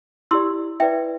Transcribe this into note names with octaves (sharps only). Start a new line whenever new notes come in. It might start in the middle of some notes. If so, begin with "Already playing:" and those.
E4 G4 D5 C6 E6
E4 B4 D5 E5 G5